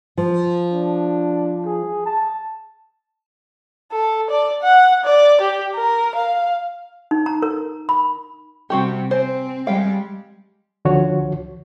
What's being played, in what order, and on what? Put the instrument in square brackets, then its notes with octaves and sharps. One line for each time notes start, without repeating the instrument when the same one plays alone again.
[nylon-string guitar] F3
[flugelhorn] D4
G#4
A5
[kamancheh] A4
D5
F#5
D5
G4
A#4
F5
[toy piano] D#4
A#5
A#4
B5
[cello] C3 G3 [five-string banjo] C4 F#4 G4
[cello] C4 [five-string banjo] C5 G#5
[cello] G3 G#3 [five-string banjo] F5 G5
[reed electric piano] C#2 D3 F3 F#4 C#5